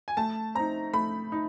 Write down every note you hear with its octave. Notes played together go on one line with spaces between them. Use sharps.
G#5
A3 A5
C4 D#4 A#5
A3 B5
D#4